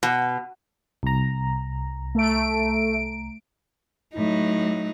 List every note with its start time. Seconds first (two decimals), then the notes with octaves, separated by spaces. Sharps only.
0.03 B2
1.03 C2 A#5
2.15 A3 D7
4.14 A2 F#3 D#4